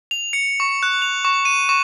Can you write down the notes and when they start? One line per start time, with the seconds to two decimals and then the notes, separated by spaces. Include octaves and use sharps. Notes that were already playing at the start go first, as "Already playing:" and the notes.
0.11 F7
0.33 C#7
0.60 C#6
0.83 F#6
1.02 F7
1.25 C#6
1.45 D#7
1.69 C#6